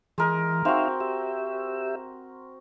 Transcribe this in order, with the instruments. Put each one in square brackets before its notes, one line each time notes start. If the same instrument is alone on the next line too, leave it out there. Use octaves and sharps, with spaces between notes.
[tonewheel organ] E3 [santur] G#3 A#4
[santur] C4 F#4 [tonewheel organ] D#4 E5 F5
[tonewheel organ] G4 E5